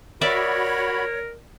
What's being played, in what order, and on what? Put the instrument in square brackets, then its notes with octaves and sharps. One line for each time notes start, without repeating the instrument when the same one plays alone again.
[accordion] F#4 B5 [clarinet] A#4 [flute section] C#5 [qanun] D5 E5